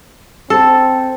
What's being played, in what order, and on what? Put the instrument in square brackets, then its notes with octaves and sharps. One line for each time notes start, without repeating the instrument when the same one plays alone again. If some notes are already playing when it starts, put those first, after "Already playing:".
[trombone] C4 [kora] A4